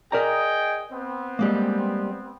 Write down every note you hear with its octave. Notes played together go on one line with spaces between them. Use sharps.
G#4 A#4 D5 D#5 G5 A#5
B3 C4
G3 G#3 A#3